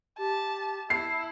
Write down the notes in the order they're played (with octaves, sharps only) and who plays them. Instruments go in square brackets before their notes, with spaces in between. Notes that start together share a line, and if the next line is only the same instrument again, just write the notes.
[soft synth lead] G4 [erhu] A5
[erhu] E4 [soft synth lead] A5 [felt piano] C7